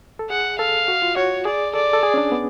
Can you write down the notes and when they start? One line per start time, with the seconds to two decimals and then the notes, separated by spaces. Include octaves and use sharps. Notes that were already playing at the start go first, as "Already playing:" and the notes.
0.19 A4
0.29 G#4 F#5
0.58 A4 F5
0.88 F#4
1.02 F4
1.16 F#4 C#5
1.45 G#4 D5
1.74 A4 D5
1.93 A4
2.03 G#4
2.14 C#4
2.18 D4
2.32 B3